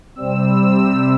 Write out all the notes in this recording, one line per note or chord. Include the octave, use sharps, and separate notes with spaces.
C3 G3 C4 E6